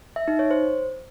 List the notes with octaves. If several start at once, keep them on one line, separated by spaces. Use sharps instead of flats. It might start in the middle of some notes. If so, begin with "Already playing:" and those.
E5
D#4
C#5
C5